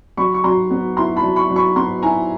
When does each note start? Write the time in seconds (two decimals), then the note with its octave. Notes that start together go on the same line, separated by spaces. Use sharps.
0.17 F#3 B5 C#6
0.34 C#6
0.44 F#3 A#5 C6
0.70 B3
0.97 E4 A#5 C6
1.16 A5 B5
1.23 F#3
1.36 B5 C#6
1.50 F#3
1.56 B5 C#6
1.76 B3 A#5 C6
2.02 E4 G#5 A#5